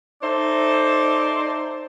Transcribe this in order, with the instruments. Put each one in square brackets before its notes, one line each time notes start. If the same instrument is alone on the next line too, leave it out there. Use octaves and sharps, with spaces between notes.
[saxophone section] D#4 A4 C5 D5 E5